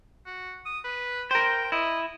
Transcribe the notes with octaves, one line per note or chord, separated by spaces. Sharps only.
F#4
D#6
B4
A#4 C5 G5
E4 D#5